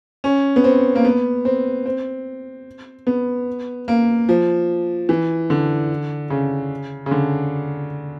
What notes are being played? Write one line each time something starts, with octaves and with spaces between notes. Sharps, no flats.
C#4
B3
C4
A#3
B3
C4
C4
B3
A#3
F3
E3
D3
C#3
C#3
D3